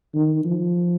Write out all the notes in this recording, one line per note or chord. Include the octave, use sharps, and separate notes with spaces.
D#3
F3